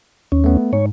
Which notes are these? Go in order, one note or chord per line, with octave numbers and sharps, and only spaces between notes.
D#2 C#4
A3 B3
G#2 C#5